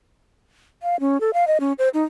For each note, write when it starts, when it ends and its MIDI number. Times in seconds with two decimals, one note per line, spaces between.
0.83 0.99 77
1.00 1.20 61
1.20 1.31 69
1.34 1.47 77
1.47 1.58 75
1.60 1.73 61
1.78 1.89 72
1.94 2.02 63